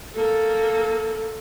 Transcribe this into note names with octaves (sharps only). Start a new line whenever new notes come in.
A#3 A4